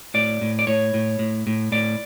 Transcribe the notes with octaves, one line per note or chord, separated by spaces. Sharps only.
A2 D5
A2
D5
A2 C#5
A2
A2
A2
A2 D5